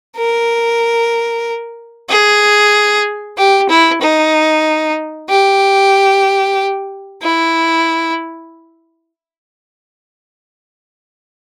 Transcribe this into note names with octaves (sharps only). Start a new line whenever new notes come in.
A#4
G#4
G4
E4
D#4
G4
E4